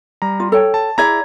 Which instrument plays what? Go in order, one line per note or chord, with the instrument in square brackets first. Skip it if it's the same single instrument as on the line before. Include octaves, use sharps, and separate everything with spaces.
[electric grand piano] G3 A#5
[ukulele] F4
A4 C#5 G5
[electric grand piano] A5
[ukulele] E4 G#4 D5 [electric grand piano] A#5 G#6